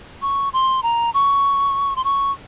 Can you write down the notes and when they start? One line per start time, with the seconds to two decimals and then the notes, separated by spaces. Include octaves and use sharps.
0.22 C#6
0.53 C6
0.83 A#5
1.14 C#6
1.96 C6
2.04 C#6